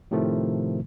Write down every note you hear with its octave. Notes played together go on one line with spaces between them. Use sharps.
A2 C3 D#3 F3 A3